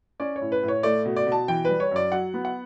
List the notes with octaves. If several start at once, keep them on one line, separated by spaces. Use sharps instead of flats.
C#4 D5
C#5
A2
B4
A2
C#5
A3 D5
B2
D5
B2
A5
E3 G5
G3 B4
C#5
F#2 D5
F#3 F#5
B3
F#5